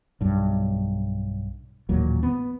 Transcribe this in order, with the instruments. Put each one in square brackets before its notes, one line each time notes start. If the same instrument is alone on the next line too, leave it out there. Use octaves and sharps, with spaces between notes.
[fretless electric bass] B1 G2
A1 D#2 A#2 F#3
B3